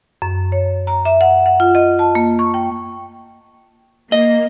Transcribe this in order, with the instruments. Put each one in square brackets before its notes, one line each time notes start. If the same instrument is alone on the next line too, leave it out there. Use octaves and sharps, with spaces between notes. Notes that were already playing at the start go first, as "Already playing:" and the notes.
[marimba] F#2
C#5
A#5
E5
F#5
F#5
F4
D#5
A5
A#3
C#6
G5
[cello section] A#3 [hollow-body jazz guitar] D#5